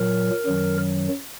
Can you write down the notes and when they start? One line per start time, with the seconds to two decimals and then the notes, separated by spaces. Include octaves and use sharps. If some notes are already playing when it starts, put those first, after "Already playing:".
Already playing: A#2 F#3 A#4
0.46 F#2 D#3 F#3